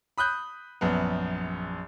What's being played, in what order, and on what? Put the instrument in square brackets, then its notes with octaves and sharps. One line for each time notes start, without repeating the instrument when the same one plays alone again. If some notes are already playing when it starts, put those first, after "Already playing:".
[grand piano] B5 D#6 F#6 G6
A#1 F#2 B3